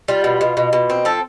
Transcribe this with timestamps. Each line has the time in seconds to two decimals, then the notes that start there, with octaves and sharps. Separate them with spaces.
0.08 G3 F4
0.24 B2
0.41 B2
0.57 B2
0.73 B2
0.90 C4
1.05 F3 A4